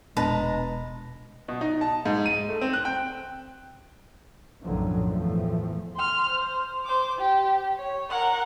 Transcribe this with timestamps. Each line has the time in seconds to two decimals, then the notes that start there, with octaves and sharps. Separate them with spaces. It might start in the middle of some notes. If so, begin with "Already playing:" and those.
0.17 E1 A#2 G#3 B3 D4 B4 A5 A#5
1.48 B2
1.61 D#4
1.81 A5
2.05 G#2
2.26 D#7
2.49 A3
2.61 C4
2.73 F#6
2.85 G5
4.63 B1 F#2 A2 D3 F3 F#3
5.07 E2 A2 F3 A3
5.96 C6 F6
6.28 C5
6.85 C5 D6
7.19 G4
7.77 C#5
8.10 A#4 F#5